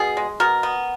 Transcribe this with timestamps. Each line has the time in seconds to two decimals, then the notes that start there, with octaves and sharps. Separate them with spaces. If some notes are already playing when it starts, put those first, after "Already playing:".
Already playing: B2 G#4
0.17 G#3
0.40 B2 A#4
0.63 B3